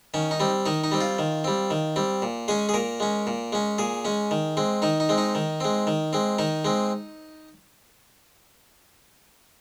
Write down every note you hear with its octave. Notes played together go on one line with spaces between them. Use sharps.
D#3 C#4
D#4
G3 C4
D#3 D#4
D#4
G3 C4
F4
D#3
G3 C4
D#3
G3 C4
A#2
G#3 C#4 G#4
G#4
A#2 A#4
G#3 C#4
A#2
G#3 C#4
A#2 G#4
G#3 C#4
D#3
G#3 C4
D#3 D#4
D#4
G#3 C4
D#4
D#3
G#3 C4
D#3
G#3 C4
D#3 D#4
G#3 C4